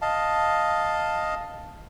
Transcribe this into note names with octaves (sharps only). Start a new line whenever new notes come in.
D#5 F5 A5